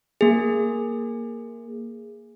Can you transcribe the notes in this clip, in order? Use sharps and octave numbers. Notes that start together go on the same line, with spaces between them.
A#3 G#4